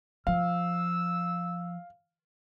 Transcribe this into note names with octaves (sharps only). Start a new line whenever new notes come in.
F3 F5 E6